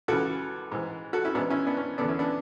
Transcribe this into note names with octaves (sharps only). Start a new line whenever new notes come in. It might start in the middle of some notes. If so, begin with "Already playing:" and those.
C#2 C#3 E3 F#4 A4
G#2 E3
F#4 A4
C#4 E4
G#2 E3 B3 D4
C#4 E4
B3 D4
C#4
E2 D3 B3 D4
C#4 E4
B3 D4